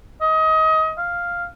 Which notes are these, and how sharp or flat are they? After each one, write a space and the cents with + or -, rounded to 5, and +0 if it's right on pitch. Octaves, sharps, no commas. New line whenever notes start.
D#5 +25
F5 +0